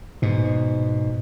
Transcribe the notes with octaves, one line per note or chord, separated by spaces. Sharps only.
G#2 B2